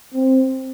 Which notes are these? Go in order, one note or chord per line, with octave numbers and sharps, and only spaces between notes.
C4